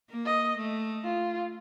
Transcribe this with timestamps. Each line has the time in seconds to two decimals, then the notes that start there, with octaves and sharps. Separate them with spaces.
0.10 A#3
0.26 D#5
0.57 A3
1.05 F4